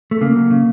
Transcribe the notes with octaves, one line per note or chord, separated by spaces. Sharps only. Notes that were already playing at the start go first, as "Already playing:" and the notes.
A3
C#3 A#3
F#3
C#3